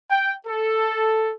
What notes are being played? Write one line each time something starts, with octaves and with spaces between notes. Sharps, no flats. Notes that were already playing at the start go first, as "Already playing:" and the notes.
G5
A4